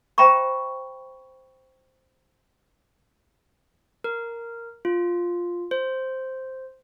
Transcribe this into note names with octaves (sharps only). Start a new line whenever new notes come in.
C5 E5 G5 A#5 B5 C#6
A#4
F4
C5